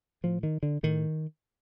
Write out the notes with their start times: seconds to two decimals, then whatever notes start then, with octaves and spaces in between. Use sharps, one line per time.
0.24 A2 F3
0.43 D#3
0.63 D3
0.83 A2 D#3